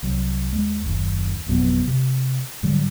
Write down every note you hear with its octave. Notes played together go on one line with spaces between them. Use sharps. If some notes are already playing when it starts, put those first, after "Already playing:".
C2 F#3
D#2 G#3
F#1 D#2
G#1 F2 B2 F#3
C3
G#2 D3 F#3 G3